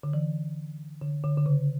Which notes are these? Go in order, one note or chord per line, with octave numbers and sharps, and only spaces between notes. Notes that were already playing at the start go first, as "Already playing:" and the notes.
D3
E3
D3
D3
D3
C#3